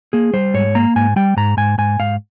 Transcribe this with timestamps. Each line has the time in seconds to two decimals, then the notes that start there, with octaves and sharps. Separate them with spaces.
0.13 A#3 G#4
0.33 G3 C5
0.54 G#2 C#5
0.75 A#3 A#5
0.96 G#2 G#5
1.16 G3 G5
1.37 G#2 A#5
1.57 G#2 G#5
1.78 G#2 G#5
1.99 G#2 F5